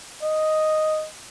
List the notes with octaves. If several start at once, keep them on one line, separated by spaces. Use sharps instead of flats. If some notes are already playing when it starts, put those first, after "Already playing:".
D#5